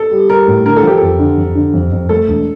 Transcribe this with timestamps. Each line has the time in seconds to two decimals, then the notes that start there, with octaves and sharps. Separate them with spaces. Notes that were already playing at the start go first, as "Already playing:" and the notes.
Already playing: A4
0.11 G3
0.29 G3 A#4
0.48 A2
0.65 D3 A#4
0.76 A4
0.83 F3 G4
0.98 F2 A4
1.19 D3
1.37 F2
1.55 D3
1.73 F2
1.92 F2
2.09 A3 A4
2.28 E1